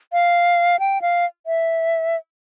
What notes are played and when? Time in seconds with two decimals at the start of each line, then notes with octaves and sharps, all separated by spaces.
0.13 F5
0.80 G5
1.02 F5
1.47 E5